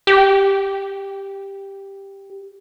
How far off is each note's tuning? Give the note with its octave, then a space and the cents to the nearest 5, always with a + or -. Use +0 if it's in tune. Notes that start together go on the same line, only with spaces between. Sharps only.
G4 +5